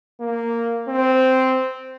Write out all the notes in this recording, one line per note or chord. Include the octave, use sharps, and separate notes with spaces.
A#3
C4